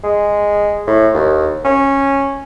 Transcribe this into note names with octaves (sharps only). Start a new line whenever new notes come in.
G#3
A2
D#2
C#4